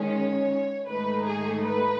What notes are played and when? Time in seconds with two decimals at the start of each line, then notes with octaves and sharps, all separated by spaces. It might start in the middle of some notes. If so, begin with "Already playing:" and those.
Already playing: D#3 G#3 C#4
0.11 C#5
0.87 G#2 D#3 A3 D#4 B4
1.26 G#4
1.64 B4